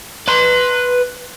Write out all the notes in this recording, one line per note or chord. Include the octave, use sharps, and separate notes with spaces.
B4 C6